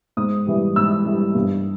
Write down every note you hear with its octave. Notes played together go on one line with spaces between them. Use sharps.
G#2 D#6
E3 G3
G#2 E6
E3 G3
G2